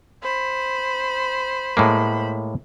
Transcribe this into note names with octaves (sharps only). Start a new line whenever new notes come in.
C5 B5
A2 G#3 A#3